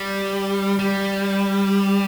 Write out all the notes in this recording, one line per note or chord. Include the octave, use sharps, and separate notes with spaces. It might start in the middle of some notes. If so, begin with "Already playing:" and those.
Already playing: G3
G3